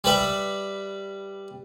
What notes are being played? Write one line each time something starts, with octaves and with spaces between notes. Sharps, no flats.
G3 B4 E5